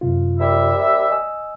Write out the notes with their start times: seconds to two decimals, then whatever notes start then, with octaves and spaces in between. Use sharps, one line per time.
0.01 F#2 C3 F4
0.40 D#2 G3 E5
1.11 D#5 G#5 E6